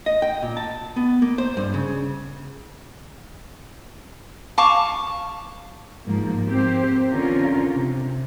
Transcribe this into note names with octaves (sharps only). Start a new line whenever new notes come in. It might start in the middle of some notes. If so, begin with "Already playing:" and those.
D#5
G5
A#2
A5
B3
A#3
C5
G2
C#3
F5 A5 C#6 D6
G#2 F3 A#3
A#3 C4 G4 C5
D3 C#4 F4 A#4
C3